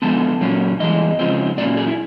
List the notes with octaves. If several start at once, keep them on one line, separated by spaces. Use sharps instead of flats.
D3 F3 G#3 B3 A5
A#2 F#3 A#3 C#4
G2 E3 G#3 D#5
C#3 F3 G#3 C4
A#2 F#3 A#3 C#4 D5
G#4
E4